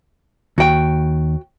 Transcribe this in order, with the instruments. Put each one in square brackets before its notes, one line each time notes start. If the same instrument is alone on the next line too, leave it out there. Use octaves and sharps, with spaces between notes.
[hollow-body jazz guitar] D#2 [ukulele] F#4 G5